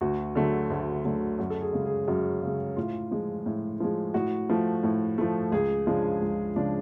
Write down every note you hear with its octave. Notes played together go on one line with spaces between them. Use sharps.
D2 F#4
D3 F#3 A3
D2
D3 F#3 A3
F#2 F#4
A4
G#4
C#3 G#3
G#4
F#2 F#4
C#3 G#3
A2 F4
F3 G#3
A2
F3 G#3
A2 F#4
F3 A3
A2
F3 A3
C#2 G#4
C#3 F3 G#3 D4
C#2
C#3 F3 G#3 D4